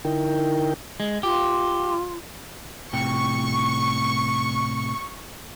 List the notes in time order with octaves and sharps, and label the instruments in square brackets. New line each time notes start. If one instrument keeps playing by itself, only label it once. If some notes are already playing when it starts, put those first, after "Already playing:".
[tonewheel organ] D3 D#4 E4 A#4 G5
[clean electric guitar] G#3
[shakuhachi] F4 [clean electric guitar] G4
[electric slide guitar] A2 C3 G5 [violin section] C#6